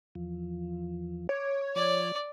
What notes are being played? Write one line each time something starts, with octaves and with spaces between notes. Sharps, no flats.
E2 F3
C#5 D6
F3 D5